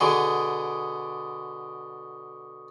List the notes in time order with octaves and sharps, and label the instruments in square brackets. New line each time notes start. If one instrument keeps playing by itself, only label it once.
[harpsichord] B2 D3 G#4 [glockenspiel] C#6 D#6 G7